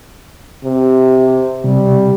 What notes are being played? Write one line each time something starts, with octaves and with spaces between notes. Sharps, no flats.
C3
C3 G3